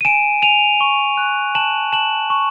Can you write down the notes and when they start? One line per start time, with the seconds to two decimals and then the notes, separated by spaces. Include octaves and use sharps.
0.01 D#7
0.05 G#5 D7 E7
0.42 G#5 D#7 F7
0.81 C#6
1.17 F#6
1.55 A5 E7 F#7
1.93 A5 E7 F#7
2.30 C#6